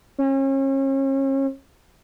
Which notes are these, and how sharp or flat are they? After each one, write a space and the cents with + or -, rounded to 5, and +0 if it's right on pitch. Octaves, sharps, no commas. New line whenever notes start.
C#4 -35